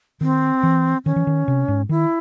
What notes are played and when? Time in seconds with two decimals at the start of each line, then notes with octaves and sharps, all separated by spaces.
0.21 D#3 C4
0.63 E3
1.06 D#3 C#4
1.16 E3
1.27 D#3
1.48 C3
1.68 G#2
1.89 D#3 E4